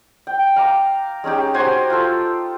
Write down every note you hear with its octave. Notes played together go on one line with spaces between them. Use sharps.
G5
F5 A#5 D6
G#3 C#4 D#4 G4
F#4 G4 C5 G#5
F4 A4